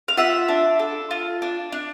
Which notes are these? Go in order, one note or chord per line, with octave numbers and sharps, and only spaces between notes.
F5
F4 E5 F#5
D4
A4
F4
D4
D4